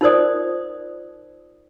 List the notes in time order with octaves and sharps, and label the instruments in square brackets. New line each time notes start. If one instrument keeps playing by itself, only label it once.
[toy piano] D#4 F4 A#4 C5 D5 D#6